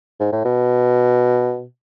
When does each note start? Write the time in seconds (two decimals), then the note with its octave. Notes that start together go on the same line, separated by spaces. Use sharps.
0.20 G#2
0.33 A2
0.45 B2